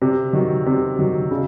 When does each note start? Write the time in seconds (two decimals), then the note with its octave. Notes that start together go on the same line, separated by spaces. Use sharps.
0.02 C3
0.33 D#3 F#3
0.66 C3
0.99 D#3 F#3
1.31 C#3